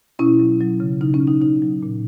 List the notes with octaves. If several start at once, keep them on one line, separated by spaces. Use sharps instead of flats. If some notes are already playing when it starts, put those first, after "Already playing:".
B2 C#4 E4
F#3
F#3
C#3
C#3 D#4
C#4
C#3
D#4
C#3 D#4
F#3
A#2